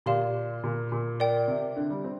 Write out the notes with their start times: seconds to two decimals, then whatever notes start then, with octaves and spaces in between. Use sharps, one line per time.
0.06 A#2 G4 D5 F5 C6
0.64 A#2
0.92 A#2
1.20 A#4 D5 G5
1.48 C3
1.76 D3
1.90 G3
2.04 C4